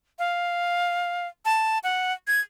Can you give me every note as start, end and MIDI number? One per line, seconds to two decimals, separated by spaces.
0.19 1.27 77
1.45 1.79 81
1.84 2.13 78
2.27 2.41 92